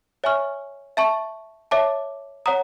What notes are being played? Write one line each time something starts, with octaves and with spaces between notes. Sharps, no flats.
C#5 E5 G#5 C#6 F6
E5 A5 C#6
C#5 E5 A5 D6
C#5 F#5 A#5 D#6